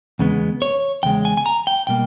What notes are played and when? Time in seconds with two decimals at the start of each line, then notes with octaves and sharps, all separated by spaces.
0.19 E2 C#3 G#3 B3
0.62 C#5
1.03 E2 C#3 G#3 G5
1.25 G#5
1.37 G#5
1.46 A#5
1.67 G5
1.87 B2 G3 A#3 G5